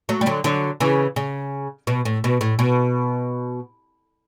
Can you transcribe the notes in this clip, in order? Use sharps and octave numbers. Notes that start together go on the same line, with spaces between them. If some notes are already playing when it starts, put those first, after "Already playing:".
F#3 A3
G3
D3 F#3
D3 F#3
C#3 E3
C#3
B2
A2
B2
A2
B2